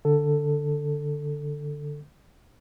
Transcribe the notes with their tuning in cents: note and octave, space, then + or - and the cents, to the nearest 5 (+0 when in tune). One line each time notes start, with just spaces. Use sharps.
D3 +0 A4 +10